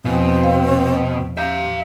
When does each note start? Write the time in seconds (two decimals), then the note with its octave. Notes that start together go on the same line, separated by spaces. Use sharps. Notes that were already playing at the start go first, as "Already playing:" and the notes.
0.05 E2 B2 F3 C4
0.43 C5 F5 G5
1.37 E5 F5 A#5 G6